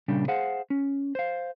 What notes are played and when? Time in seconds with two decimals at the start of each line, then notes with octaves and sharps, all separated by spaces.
0.08 A#2 C#3 G3 D4 G4
0.28 G#4 C5 F5 F#5
0.70 C#4
1.15 C5 F5